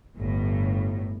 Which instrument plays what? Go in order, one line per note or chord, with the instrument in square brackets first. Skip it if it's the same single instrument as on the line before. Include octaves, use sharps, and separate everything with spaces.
[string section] G1 A2